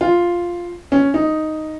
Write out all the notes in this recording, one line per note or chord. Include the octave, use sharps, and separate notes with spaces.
F4
C#4
D#4